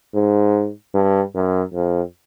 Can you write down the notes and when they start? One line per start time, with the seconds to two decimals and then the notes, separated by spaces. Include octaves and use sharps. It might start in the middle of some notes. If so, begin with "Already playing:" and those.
0.14 G#2
0.94 G2
1.35 F#2
1.74 F2